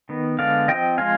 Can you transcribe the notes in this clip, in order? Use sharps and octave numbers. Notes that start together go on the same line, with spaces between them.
D#3 B3
D3 G#3 B3 D5 F5
F3 C4 D#5 G5
F3 G#3 C4 F5 G#5